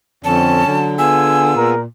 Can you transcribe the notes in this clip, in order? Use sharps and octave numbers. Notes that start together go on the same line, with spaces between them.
F2 D3 C4 C#4 A5
D3 F#3
B3 F4 G#4 G#5 E6
A#2 A#4